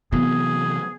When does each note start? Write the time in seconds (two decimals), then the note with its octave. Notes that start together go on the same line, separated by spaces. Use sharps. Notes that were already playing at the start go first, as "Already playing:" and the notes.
0.13 C3 E3 F#3 B3 G#4